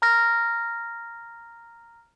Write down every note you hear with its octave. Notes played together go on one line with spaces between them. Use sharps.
A#5 F6 A#6